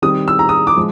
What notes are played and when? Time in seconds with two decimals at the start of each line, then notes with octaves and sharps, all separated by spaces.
0.02 D#3 G3 C4 D#6
0.28 E6
0.39 A#5
0.49 D#6
0.67 D6
0.77 F3 G#3